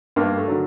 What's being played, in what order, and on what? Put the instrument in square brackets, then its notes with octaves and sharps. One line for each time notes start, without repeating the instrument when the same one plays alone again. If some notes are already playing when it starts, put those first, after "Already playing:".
[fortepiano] G2 A#3
A3
D3 F#3